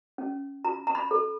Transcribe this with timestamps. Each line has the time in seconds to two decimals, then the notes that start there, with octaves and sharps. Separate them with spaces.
0.18 C#4
0.65 F4 A#5
0.87 A#5
0.95 B5
1.11 A4